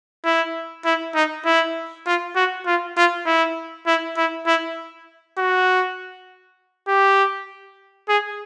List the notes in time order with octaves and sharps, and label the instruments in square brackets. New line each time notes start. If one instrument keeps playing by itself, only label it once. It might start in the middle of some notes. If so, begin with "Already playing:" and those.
[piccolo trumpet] E4
E4
D#4
E4
F4
F#4
F4
F4
E4
E4
E4
E4
F#4
G4
G#4